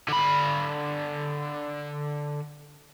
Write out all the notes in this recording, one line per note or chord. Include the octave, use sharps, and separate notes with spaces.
D3 B5